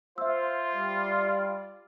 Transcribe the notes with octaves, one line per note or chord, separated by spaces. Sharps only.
F4 C5 E5 E6
G3 D5